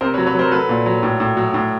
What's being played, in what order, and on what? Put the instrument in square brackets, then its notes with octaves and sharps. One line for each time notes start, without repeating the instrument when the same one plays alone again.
[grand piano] C3 A#4 C5
B4 C#5
F#3
B4 C#5
F#3 A#4 C5
F#3 A4 B4
A#2
F#3
A2
A2
F#3
A2